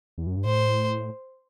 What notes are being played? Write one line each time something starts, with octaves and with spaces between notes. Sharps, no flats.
E2
F#2
G2
A2 C5